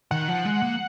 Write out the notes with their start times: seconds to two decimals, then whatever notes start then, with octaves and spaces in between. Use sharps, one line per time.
0.11 D#3 F#5
0.28 F3
0.45 G#3
0.62 A#3